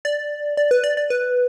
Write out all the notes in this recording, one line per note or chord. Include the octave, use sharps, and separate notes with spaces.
D5
D5
B4
D5
D5
B4